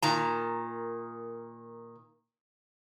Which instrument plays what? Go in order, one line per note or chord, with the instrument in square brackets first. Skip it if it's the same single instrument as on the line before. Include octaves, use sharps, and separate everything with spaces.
[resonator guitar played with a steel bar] A#2 D#3 A#5